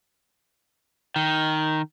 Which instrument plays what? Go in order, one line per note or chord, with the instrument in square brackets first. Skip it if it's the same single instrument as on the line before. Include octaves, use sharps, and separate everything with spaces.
[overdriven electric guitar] D#3